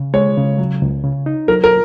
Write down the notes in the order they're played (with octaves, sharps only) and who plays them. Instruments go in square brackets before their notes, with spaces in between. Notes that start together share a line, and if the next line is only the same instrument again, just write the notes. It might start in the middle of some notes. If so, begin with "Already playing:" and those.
Already playing: [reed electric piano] C#3
[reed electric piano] G#3 [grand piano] C#5
[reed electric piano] C#3
F#3
C#2
C#3
D#4
[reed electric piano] F#3 [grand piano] A#4
[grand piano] A#4